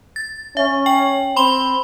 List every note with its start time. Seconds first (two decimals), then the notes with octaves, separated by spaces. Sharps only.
0.16 A6
0.57 C#4 E5
0.86 G5 F#7
1.36 C4 B5 C6 G7